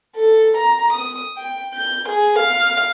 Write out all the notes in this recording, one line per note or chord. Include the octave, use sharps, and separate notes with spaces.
A4
A#5
D#6
G5
G6
G#4
F5